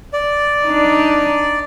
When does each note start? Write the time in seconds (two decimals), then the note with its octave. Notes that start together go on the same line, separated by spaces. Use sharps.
0.13 D5
0.65 D4 D#4